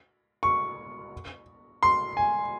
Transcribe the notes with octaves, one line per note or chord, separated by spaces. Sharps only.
C#6
C6
G#5